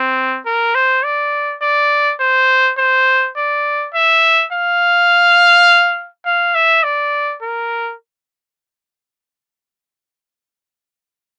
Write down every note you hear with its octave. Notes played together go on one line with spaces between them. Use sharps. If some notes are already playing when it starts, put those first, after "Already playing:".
Already playing: C4
A#4
C5
D5
D5
C5
C5
D5
E5
F5
F5
E5
D5
A#4